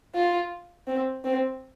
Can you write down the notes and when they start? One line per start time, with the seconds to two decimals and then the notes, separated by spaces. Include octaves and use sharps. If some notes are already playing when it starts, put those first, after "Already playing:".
0.15 F4
0.87 C4
1.24 C4